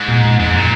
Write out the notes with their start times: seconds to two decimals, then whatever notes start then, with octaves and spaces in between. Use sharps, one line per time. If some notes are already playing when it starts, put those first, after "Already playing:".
Already playing: G#2
0.09 A#2
0.24 A#2
0.39 F2 G#2
0.50 F#2
0.55 A#2